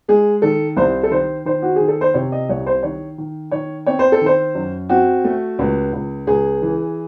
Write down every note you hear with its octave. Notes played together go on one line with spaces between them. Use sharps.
G#3 G#4
D#3 A4
C2 C5
A4
D#3 C5
D#3 C5
F#4
D#3 G#4
A4
C5
C3 C#5
D#5
C2 C#5
C5
D#3 C#5
D#3
D#3 C#5
C4 C#5
C5
A4
D#3 C5
F#2
C4 F#4
A3
C#2
C#2
C#2 G#4
E3